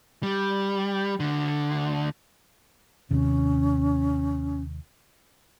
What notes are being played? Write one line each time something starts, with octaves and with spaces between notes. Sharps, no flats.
G3
D2 D3
D#2 C3 C#4